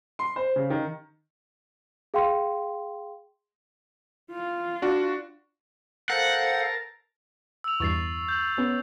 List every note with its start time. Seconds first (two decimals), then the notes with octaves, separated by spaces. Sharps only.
0.19 C6
0.36 C5
0.56 C#3
0.70 D#3
2.14 G#4 F5 G5 C6
4.31 F4
4.82 D4 F#4
6.10 A4 A#4 C5 F5 F#5 A5
7.64 E6 F7
7.80 E2 G2 C#6 A6 C7
8.28 G6 F#7
8.57 B3 C#4